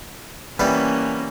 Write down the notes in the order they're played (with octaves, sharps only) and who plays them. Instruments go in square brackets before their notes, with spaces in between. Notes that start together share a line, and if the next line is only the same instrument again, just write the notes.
[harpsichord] E3 G3 B3 [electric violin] A#3 C#4